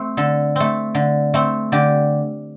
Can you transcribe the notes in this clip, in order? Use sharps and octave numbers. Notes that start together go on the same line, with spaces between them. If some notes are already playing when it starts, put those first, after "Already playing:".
Already playing: A3 C4
D3 A4
A3 C4
D3
A3 C4
D3 G4